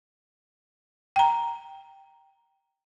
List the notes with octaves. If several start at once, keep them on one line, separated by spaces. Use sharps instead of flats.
G5 A#5